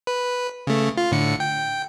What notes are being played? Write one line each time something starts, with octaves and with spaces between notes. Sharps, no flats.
B4
C#3 A3
F4
A2 D3 C#7
G5